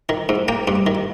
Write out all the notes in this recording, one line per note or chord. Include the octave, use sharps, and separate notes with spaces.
D#3
G#2
A#3 G5
G2
D#3